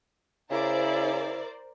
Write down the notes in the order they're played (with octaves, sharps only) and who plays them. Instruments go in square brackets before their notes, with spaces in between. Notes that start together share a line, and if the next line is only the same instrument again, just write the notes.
[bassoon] C#3 [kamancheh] E4 [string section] A#4 C5 D5